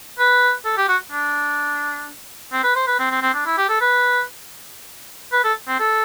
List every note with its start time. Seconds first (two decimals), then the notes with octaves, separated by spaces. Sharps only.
0.19 B4
0.65 A4
0.77 G4
0.88 F#4
1.12 D4
2.52 C4
2.63 B4
2.75 C5
2.87 B4
2.99 C4
3.11 C4
3.22 C4
3.34 D4
3.46 E4
3.57 G4
3.69 A4
3.80 B4
5.32 B4
5.44 A4
5.68 C4
5.79 A4